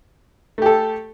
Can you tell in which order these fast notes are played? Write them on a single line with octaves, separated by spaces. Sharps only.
A3 G4 A4